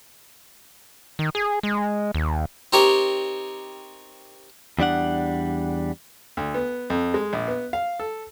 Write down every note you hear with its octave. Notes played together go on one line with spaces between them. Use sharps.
D#3
G#4
G#3
D#2
C4 D#4 G4 A#4 C#5
E2 G3 D4 F#5
D2
B3
F2
G#3
A#1
B3
F5
A4